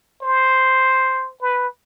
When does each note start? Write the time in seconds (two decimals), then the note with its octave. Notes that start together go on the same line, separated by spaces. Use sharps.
0.23 C5
1.42 B4